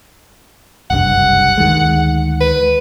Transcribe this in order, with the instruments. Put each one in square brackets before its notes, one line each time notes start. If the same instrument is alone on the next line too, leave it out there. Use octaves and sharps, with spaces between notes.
[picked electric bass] F#1 C2 G2 [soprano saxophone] F#5
[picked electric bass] D2 D#3 G#3
[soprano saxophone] B4